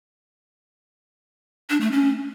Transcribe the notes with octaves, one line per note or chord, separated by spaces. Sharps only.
D4
A3
C#4